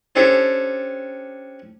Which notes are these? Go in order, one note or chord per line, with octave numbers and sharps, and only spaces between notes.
C#4 D4 G4 A4 C5